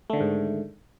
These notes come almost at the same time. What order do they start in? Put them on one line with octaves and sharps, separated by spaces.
A3 D3 D#3 G#2